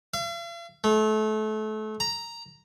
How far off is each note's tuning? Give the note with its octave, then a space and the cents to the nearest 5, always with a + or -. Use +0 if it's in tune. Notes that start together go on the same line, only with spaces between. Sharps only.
F5 -45
A3 -30
A#5 +0